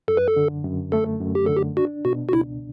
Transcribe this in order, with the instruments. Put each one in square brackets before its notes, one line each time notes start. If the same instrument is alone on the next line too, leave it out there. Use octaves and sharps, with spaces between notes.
[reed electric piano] F#2 [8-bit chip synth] A4
[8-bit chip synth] B4
A4
[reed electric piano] D3
F#2
[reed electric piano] A3 [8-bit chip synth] A4
[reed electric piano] F#2
[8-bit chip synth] G4
[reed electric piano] D3 [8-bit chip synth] A4
[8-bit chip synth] G4
[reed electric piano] D4 [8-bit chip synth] F#4
[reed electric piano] B2 [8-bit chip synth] F#4
[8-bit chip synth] F#4
[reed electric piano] C#2 [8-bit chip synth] E4